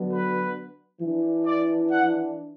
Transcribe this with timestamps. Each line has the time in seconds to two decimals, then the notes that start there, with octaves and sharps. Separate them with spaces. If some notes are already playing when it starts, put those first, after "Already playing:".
Already playing: D3 F#3 B3 D4
0.13 B4
1.01 E3 D4
1.46 D5
1.91 F#5